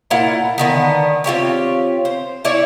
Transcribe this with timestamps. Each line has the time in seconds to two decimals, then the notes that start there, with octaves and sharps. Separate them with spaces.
0.10 A#2 E4 F4 F#5
0.58 D3 D#3 B3
1.24 C4 F4 G4 C#5
2.05 C5
2.45 E4 C#5 D5